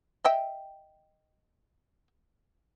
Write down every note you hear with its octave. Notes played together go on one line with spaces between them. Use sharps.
D#5 E5 G5